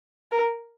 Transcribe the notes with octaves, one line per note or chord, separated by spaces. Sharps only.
A#4